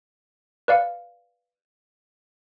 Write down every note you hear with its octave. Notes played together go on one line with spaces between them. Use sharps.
B4 D5 F5 C#7